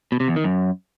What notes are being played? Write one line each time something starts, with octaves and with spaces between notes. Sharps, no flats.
B2
C3
E2
D#3
F#2